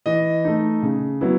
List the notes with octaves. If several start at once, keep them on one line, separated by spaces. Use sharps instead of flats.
E3 D#5
A3 D#4
C#3
F#3 B3 E4